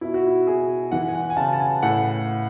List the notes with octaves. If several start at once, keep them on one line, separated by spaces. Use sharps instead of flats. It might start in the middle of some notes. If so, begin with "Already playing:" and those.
B2 E4
F#4
E4
B2 G#4
E3 F#5
G#5
F#5
G#5
C#3 A5
A5
G#5
A2 F#5